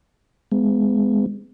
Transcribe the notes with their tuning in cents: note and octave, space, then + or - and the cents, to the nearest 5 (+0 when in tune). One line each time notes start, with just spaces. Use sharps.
G#3 +0 B3 +35